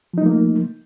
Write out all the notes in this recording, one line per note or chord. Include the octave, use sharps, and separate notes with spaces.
F3 A3 A#3 D#4